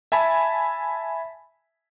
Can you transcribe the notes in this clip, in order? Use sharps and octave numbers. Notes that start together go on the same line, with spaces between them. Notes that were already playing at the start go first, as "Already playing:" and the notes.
E5 G#5 A5 B5